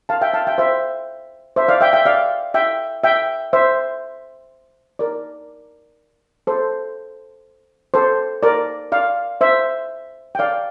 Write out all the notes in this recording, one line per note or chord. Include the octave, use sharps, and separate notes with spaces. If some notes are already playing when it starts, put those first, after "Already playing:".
F5 A5
E5 G5
F5 A5
E5 G5
C5 E5
C5 E5
D5 F5
E5 G5
E5 G5
D5 F5
E5 G5
E5 G5
C5 E5
A#4 D5
A4 C5
A4 C5
A#4 D5
D5 F5
C5 E5
G5
D5 F5